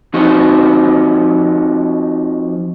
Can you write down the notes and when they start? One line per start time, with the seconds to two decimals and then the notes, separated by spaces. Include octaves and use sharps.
0.14 F3 C4 D#4 F#4